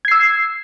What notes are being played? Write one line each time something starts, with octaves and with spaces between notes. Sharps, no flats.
E6 G#6 C7